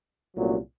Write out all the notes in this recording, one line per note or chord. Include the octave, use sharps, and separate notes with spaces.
C2 A#2 F#3 A3 C#4